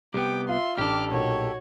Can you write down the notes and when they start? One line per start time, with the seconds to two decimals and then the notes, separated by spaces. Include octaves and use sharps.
0.14 C2 B3 G4 G5 D6
0.49 F4 E5 C6
0.78 A1 D4 G4 A4 D6 F6
1.11 B1 A#2 F#4 C#5